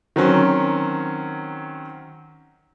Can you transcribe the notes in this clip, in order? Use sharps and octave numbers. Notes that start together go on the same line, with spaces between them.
D#3 F#3 C4 C#4